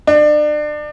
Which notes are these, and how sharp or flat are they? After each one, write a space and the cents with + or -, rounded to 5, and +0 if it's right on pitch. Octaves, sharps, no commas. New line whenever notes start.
D4 +35